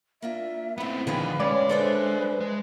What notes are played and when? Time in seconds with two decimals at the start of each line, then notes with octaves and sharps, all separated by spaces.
0.22 A#3 D4 F4 E5
0.78 D#2 A2 B3 C4 B5
1.07 D3 D#3 F3 G#4 B4 F5
1.40 G#3 C#4 D5
1.69 D4 A4 B4 C5 E5
2.41 G#3